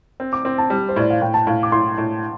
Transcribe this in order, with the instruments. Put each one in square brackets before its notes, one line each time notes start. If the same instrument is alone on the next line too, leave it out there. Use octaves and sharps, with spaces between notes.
[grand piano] C4
[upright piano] D6
[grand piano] C4 [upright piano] C6
[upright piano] A5
[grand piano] G3
[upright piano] C5
[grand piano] A2 [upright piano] D5
[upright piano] F5
[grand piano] A2 [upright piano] G5
[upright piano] A5
[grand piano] A2 [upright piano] F5
[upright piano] D6
[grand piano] A2 [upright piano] C6
[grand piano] A2